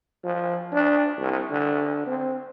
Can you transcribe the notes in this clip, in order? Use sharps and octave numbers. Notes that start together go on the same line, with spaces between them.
F3
D4
C2
D3
C4